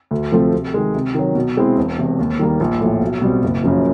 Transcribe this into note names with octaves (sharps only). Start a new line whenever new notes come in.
D2
C3 F3 A3 C4
C3
D#3 G#3
C3
D#3 F#3
B2
G#3 C4 E4
E1
E2 C3
D#2
D#3 G3 A#3
A#1
A2 F3
B1
B2 G3 C4
F#1
F#2 C#3 F3